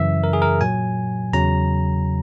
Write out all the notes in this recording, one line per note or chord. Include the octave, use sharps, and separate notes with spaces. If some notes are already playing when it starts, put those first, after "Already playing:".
Already playing: F#2 C#3 E3 E5
A#4
G#4
A#4
A#2 F#3 G#5
E2 C#3 F#3 A#5